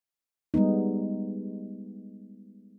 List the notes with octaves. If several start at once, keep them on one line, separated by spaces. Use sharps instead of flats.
G3 G#3 B3 D#4